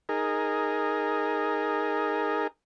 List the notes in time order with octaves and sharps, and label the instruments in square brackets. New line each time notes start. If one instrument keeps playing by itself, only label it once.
[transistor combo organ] D#4 G#4 A#4